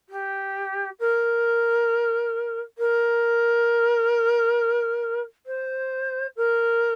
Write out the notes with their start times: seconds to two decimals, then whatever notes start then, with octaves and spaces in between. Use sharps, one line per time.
0.09 G4
1.00 A#4
2.78 A#4
5.46 C5
6.36 A#4